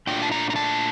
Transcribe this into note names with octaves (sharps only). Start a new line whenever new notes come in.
A#2 A3 D4 F4 G5
A5
A#5
A#5
A5